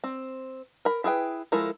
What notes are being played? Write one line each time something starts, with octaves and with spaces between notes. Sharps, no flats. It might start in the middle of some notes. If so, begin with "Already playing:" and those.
C4
A#4 B5
E4 G#4 B4 G5
F3 G#3 E4 A4 A#4